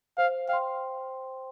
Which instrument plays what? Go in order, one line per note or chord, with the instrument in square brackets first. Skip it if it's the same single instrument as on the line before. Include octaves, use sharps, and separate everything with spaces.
[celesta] C5 [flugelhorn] F5
[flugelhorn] F5 [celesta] G5
[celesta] C6